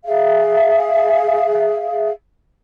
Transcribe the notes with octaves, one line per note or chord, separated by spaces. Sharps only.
G#4 E5 F5